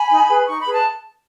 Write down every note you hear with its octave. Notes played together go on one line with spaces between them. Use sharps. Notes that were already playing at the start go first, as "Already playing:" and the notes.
Already playing: G#5 B5
D#4
G#4 B4
D#4 C#6
B5
G#4 B4
A5